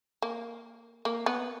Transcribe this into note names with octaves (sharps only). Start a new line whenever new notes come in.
A#3
A#3
B3